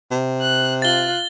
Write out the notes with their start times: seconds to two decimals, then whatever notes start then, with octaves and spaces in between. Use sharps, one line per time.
0.12 C3
0.41 F#6
0.82 F4 F#6 A6 G7